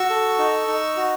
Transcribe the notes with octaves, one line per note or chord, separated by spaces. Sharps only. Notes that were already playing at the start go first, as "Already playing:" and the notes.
Already playing: F#4 C#6 E6
A4
D#4
D#4
F#4